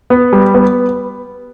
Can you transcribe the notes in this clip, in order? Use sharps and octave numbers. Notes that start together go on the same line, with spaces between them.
B3
G3
B3